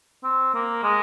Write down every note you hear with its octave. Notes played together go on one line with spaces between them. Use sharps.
C4
A#3
G#3